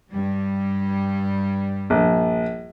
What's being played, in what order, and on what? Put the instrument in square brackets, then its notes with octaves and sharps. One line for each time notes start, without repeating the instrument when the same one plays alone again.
[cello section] G2 G3
[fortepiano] A#1